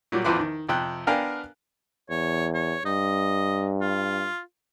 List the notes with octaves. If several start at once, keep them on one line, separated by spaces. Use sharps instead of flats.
A#2 F#3 G3
A1 E2 F3 B4 C5 D6
D#3
F2 C3 G5 F#6
B3 D4 A#4 F5 G5 G#5
E2 C#5
C#5
G2 D#5
F4